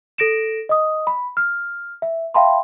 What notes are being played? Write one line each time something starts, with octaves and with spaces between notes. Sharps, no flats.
A4 A#6 D7 E7
D#5 D#6
B5
F6
E5
E5 F5 G5 A5 B5 C6